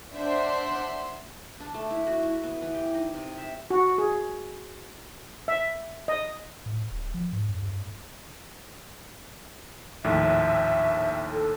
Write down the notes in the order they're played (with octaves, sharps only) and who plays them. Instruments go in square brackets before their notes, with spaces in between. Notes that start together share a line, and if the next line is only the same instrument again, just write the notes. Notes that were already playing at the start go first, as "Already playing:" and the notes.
[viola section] D4 C5 [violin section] E5 F#5 C6
[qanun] D4
A3
E4
F#4
E4
B3
E3
G4
D#4
C3
E5
[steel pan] F#4
G#4
E5
D#5
[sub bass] A2
D1
F3
G#2
F#2
G2
[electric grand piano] A#1 D#2 A2 [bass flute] E5
[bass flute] A4